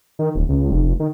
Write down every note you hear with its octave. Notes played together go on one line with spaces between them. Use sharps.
D#3
D1
C#2
F1
F1
D#3